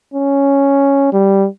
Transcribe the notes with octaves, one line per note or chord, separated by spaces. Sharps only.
C#4
G3